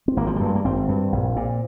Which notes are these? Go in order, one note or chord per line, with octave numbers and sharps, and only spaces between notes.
C4
G#1 A#3
F3
G3
G2
G#3
A#3
G#1 C4
G2
A#1
A#2